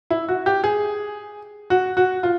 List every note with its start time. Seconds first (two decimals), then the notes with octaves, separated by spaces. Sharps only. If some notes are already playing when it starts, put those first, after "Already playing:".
0.10 E4
0.29 F#4
0.46 G4
0.64 G#4
1.70 F#4
1.97 F#4
2.23 F4